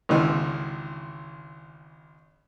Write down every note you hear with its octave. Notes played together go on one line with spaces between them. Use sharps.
G#1 C#2 D3 E3